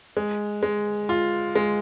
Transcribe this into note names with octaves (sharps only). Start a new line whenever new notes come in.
G#3
G#3
F4
G#3